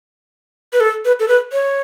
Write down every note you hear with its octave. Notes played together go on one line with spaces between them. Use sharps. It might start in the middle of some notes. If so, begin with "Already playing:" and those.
B4
A4
B4
A4
B4
C#5